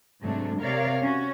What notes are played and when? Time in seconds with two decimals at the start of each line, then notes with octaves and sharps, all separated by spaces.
0.24 G#2 C3 F#3 A3 D4
0.63 C3 A#4 C#5 D5 F5
1.02 C#4 F#4